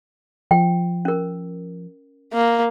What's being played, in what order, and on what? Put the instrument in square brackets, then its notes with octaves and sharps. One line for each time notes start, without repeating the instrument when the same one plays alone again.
[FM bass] F3 [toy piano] G5
[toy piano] C#4 A#4
[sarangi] A#3